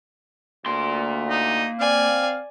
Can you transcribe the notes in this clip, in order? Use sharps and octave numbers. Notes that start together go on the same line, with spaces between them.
D2 A#3 C6
D#4
C4 D5 F5 G#5